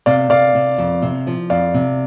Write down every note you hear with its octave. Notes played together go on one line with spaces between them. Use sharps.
C3 D5 F5
C3 D5 F5
C3
F2
C3
F3
F2 D5 F5
C3